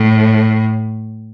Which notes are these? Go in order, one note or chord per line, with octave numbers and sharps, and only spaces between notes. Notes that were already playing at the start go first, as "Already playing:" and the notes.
Already playing: A2